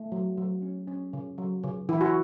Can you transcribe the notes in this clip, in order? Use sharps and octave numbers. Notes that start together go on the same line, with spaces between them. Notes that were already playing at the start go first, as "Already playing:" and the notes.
Already playing: A3
F#3
F#3
C#4
C#4
C#3
F#3
C#3
E3 E4
F#4